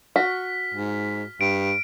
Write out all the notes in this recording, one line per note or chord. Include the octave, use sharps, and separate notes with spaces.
F#4 F6 B6
G#2
G2 D7